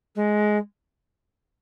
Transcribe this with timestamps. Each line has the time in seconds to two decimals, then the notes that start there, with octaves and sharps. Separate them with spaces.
0.15 G#3